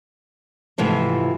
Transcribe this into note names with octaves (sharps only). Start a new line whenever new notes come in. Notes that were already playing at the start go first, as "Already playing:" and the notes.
G#2 C3 E3 F3 A3